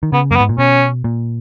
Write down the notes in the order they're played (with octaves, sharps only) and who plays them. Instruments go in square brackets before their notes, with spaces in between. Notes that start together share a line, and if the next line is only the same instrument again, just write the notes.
[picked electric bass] D#3
[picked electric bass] C#3 [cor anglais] B3
[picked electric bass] F#2 [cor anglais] A#3
[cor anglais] B3
[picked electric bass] G#2
A#2
[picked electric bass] B2 [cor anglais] C#4
[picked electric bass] A#2